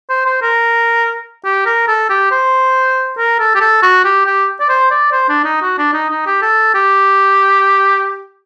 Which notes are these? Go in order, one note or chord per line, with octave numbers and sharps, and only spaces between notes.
C5
C5
A#4
G4
A#4
A4
G4
C5
A#4
A4
G4
A4
F#4
G4
G4
D5
C5
D5
C5
D4
D#4
F#4
D4
D#4
D#4
G4
A4
G4